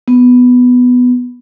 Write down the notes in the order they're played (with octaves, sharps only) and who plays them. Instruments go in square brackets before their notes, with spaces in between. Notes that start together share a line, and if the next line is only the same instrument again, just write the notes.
[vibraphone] B3